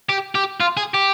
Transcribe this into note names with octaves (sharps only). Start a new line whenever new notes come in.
G4
G4
F4
G#4
G4